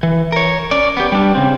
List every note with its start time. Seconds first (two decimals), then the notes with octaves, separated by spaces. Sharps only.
0.03 E3
0.32 A#4 C#5
0.71 C#4 D5
0.97 B3 G4
1.12 G3 D4
1.35 C#3 C4